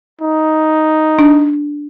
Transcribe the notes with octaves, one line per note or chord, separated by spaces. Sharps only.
D#4
D4